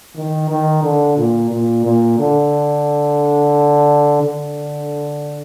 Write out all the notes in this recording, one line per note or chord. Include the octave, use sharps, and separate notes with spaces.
D#3
D#3
D3
A#2
A#2
A#2
D3
D3